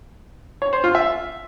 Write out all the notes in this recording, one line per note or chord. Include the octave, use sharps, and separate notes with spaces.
C#5
C5
F4
E5